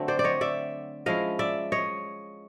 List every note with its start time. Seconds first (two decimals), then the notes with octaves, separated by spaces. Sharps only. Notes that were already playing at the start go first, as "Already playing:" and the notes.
Already playing: D3 F#3 A3 C4
0.08 C5 D5
0.19 D5
0.24 C#5 D#5
0.41 D5 E5
1.06 F3 G#3 C#4 E4 D#5 F5
1.39 D5 E5
1.72 C#5 D#5